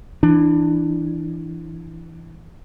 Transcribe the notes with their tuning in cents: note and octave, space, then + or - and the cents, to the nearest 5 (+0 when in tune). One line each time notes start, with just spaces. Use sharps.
E3 +0 D4 +20